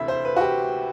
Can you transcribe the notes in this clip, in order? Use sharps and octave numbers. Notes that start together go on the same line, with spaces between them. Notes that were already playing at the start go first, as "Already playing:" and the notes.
Already playing: D2 C3 E3 E5 B5
C5
B4
F#4
G4